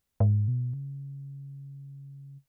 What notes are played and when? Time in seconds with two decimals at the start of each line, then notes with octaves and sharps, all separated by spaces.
0.20 G#2
0.48 B2
0.73 C#3